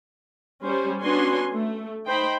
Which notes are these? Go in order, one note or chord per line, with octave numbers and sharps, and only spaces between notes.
G3 C#4 C5
B3 C#4 D4 F#4 G#5 C6
A3
D#4 C5 G5 B5